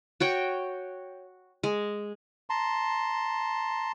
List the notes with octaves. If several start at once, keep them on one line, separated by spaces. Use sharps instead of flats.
F#4 C#5 G5
G#3
A5 A#5 C6